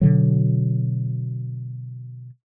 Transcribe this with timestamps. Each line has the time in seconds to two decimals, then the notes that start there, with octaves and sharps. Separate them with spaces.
0.01 B2 D3 F#3